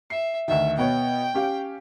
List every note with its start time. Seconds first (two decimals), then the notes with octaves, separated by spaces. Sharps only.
0.10 E5 C7
0.48 D2 D#3 E5
0.78 B2 B3 C#5 G5
1.34 C#4 G4 F5